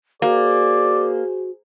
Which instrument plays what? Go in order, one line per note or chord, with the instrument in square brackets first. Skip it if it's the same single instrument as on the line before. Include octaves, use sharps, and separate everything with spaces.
[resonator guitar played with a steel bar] A#3 [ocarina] F#4 [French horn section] G#4 C5 [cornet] D5